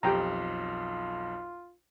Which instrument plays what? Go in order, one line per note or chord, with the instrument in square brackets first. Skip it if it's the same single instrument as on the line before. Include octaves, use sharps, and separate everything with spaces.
[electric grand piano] B1 F2 [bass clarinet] F4 [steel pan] G4 G5 A#5